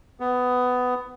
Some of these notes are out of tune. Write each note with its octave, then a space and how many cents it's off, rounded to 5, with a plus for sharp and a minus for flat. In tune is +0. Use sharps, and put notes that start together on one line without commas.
B3 +15